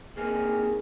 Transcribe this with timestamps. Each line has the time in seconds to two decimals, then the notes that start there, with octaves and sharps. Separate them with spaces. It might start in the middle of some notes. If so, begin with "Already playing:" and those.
0.17 A#3 C4 D#4 G#4